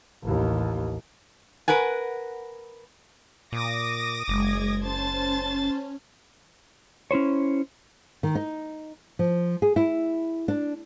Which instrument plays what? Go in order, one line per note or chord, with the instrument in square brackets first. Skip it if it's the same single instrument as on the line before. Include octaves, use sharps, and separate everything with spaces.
[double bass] A1 D#2
[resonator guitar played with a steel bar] A#4 B4 F#5 G#5
[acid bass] A#2 [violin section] D6 D#6 A#6
[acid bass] F#1 [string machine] G#3 G#6
[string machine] C#4 [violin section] C5 A5 A6
[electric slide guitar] C#4 E4 C5 C#5
[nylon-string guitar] D#3
D#4
F3
G#4
E4
D4